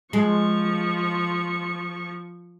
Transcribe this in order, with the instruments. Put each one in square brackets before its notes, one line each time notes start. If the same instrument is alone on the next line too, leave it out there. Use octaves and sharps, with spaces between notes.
[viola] F3 C#6 [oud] G#3